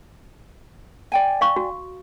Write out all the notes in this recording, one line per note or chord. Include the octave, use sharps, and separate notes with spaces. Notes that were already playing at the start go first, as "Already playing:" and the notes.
D5 G5 G#5
F5 C#6
F#4